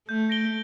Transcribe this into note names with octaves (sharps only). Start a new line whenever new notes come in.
A3 G6
A#6 D7 G7